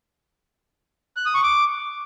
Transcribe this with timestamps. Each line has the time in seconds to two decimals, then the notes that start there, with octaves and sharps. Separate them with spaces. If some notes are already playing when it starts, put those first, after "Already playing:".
1.17 F#6
1.26 D#6
1.34 C#6
1.43 D6